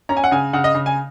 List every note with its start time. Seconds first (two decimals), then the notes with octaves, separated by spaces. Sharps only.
0.09 C#4 A#5
0.17 G#5
0.24 F#5
0.31 C#3 G#5
0.53 C#3 F#5
0.64 D#5
0.75 C#3
0.86 G#5